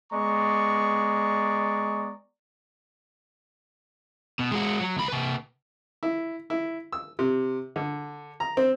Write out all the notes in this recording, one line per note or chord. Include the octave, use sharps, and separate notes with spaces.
G#3 B3 D5 A#5 C#6
B2
G#3 F#4
F#3
C#2 B5
C3 B4
E4
E4
E6
C3
D3
A#5
C4